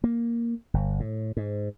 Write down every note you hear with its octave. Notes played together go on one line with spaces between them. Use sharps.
A#3
G1
A2
G#2